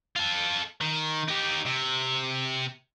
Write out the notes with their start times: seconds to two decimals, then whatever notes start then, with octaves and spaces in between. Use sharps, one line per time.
0.16 F4 A4
0.81 D#3
1.29 D#4 G4
1.66 C3